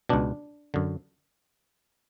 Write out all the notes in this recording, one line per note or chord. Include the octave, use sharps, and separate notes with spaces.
C#2 B2 D4
F#2 D3